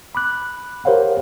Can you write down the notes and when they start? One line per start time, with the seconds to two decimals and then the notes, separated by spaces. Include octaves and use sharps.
0.15 B5 D6 F#6
0.85 G4 A#4 C5 C#5 F5 F#5